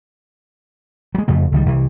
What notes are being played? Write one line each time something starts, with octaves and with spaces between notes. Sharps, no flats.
F#3 G#3
F2 C#3 A3
C#2 D#3 G3
C2 E3